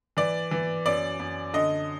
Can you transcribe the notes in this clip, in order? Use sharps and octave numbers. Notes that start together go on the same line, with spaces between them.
E3 D5
E3
F#2 D5
F#2
D3 D#5